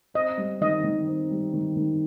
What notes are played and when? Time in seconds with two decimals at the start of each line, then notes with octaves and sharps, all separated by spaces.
0.14 C4 D#5
0.37 G3
0.61 D#3 D#5
0.84 D#3
1.07 C4
1.31 G3
1.54 D#3
1.77 D#3